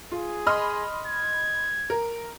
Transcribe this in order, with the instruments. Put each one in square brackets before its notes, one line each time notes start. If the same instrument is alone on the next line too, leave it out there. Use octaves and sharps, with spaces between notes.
[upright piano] F4 [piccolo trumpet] G#4
[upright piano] D#5 C6 [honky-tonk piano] B5 F6
[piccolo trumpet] G#6
[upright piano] A#4